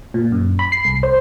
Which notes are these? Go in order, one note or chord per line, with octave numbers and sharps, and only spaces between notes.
A#2
F#2
B5
C7
C2
C5